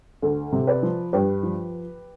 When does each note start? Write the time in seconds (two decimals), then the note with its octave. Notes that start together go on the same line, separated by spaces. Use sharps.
0.22 D2
0.53 C3
0.67 B4 D5
0.83 F3
1.13 G2 G4 B4
1.43 F3